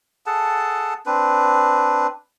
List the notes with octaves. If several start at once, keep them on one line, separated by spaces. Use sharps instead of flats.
G#4 A4 F#5 A5
C4 D4 B4